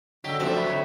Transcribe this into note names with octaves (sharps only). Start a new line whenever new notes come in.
D3 F#3 G4 D#5 G5 E6
F3 F#3 A3 C4 D4 F#4 E5
G5 B5 C#6
D3 C#5